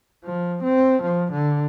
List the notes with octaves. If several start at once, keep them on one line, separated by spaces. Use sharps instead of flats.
F3
C4
F3
D3